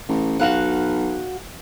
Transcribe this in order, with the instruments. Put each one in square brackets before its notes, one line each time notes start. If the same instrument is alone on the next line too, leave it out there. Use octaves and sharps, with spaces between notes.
[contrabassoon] A1
[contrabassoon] B1 [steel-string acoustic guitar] F#4 F5 F#5